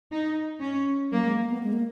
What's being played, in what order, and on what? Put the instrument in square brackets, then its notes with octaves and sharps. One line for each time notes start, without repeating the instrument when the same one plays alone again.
[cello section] D#4
C#4
[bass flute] F#3 [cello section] A#3
[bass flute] G#3
A#3
B3
G#3
A#3